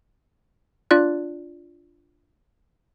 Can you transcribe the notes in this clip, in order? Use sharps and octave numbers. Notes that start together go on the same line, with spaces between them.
D4 F4 D5 F#6